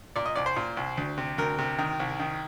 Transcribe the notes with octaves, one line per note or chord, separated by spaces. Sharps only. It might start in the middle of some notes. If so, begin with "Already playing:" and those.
A#2 D5
D#5
C2 D5
C5
A#2
C2
D2
C3
D2 A#4
C3
D#3
C2
D#3